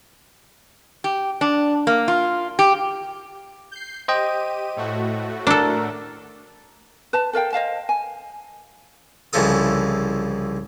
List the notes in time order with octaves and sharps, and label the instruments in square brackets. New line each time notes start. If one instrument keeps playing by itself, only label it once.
[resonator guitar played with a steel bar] G4
D4
A#3
F4
G4
[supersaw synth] G6 C7
[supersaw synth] G4 D#7 [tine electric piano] C5 D#5 G5
[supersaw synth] A2 A3 F#4
[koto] D4 A4 [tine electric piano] A#4
[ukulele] B4 A5
A4 A#4 F5 G5
C5 D#5 F5 A5
G#5
[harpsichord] C2 C#3 E3 F3 A4 D#6